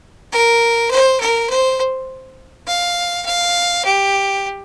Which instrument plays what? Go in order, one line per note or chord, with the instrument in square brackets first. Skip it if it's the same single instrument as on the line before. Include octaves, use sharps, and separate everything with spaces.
[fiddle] A#4
C5
A#4
C5
F5
F5
G4